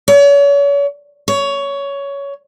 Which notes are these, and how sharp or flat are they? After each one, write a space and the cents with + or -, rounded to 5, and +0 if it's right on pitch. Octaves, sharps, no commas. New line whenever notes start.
C#5 +40
C#5 +15